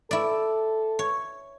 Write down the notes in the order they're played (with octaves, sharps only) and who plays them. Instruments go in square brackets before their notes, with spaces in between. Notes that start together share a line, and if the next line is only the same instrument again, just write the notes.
[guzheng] E4 D5 [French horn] A4
[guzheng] C#5